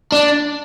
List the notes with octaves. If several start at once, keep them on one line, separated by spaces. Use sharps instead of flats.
D4